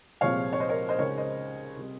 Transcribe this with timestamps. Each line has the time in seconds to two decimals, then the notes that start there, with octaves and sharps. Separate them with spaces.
0.21 C2 A#2 F3 G#3 C4 C#5 F5
0.53 C#5
0.60 C5 D#5
0.69 A#4 C#5
0.89 C5 D#5
0.98 C#2 C#3 G#3 D#4 A#4 C#5
1.18 C5 D#5
1.77 C3 G3